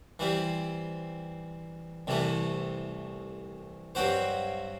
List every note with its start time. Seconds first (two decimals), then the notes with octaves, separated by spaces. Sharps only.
0.19 E3 G3 C4
2.07 C2 C3 E3 A3
3.95 G2 F#3 C4 F#4 C5